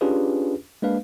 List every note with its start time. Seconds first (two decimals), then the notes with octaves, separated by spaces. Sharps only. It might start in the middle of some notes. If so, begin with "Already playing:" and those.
0.01 C#4 D4 F4 G4 G#4 B4
0.82 G#3 A#3 D4 B4 F5